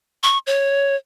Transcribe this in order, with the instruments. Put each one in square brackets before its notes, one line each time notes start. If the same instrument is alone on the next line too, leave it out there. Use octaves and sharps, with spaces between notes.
[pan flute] C#6
C#5